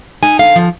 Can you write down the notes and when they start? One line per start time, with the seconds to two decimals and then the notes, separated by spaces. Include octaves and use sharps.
0.23 D#4 G#5
0.39 D3 F5
0.56 F3